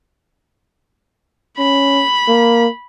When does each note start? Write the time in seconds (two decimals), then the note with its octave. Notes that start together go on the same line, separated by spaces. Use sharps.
1.58 C#4 B5
2.28 A#3